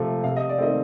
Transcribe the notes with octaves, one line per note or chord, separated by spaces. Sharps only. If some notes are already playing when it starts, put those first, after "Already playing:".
Already playing: C3 F3 A3
C3 F5
D#5
D5
D#3 A3 C4 D#5